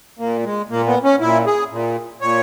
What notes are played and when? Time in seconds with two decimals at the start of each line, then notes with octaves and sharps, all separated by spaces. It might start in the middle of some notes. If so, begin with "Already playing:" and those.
0.19 A#2 A#3
0.44 G#3
0.70 A#2 A#3
0.87 B3
1.04 C#4
1.20 A#2 E4
1.46 G#4
1.71 A#2
2.22 A#2 C#5